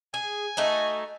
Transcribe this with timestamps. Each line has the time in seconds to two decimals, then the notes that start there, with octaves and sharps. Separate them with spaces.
0.14 G#4 G#5
0.57 A3 D#4 F#4